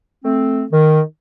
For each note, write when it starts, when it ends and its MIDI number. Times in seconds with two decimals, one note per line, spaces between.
0.24 0.64 57
0.24 0.64 60
0.71 1.00 51